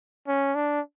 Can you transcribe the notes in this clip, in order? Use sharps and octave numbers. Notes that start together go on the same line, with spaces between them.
C#4
D4